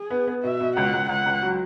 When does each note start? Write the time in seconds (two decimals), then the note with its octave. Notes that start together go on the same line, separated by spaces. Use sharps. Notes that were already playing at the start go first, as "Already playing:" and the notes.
Already playing: G#4
0.10 B3
0.27 B3
0.44 B2 E5
0.60 B2
0.76 C#2 F#5
0.93 C#2
1.09 C#2 F#5
1.26 C#2
1.42 F#3